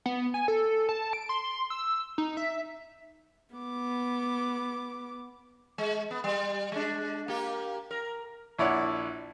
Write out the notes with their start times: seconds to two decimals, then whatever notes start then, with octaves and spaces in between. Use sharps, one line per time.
0.06 B3
0.34 G#5
0.48 A4
0.89 A5
1.13 D7
1.29 C6
1.70 E6
2.18 D#4
2.37 E5
3.55 B3 D6
5.78 G#3
6.11 B3
6.24 G3
6.72 G#3 D4
7.28 A#3 G4
7.91 A#4
8.58 A#1 E4 C#5 D5 F#5